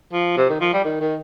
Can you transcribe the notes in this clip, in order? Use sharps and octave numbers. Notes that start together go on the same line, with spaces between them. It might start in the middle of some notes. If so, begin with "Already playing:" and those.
F3
C3
D#3
F3
G3
D#3
D#3